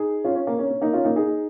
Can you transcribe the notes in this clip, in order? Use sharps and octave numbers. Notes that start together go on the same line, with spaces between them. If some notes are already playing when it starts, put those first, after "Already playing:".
Already playing: D#4 G#4
C#4 F4
C#4
A#3
C#4
C#4
A#3 D#4
C#4 F4
A#3 D#4
D#4 G#4